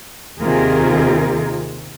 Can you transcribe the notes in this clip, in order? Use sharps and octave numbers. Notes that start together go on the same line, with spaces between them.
D#2 C3 D#3 F4 G#4 A#4